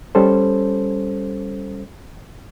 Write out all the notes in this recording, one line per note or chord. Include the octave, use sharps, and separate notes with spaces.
G3 C#4 A4 C5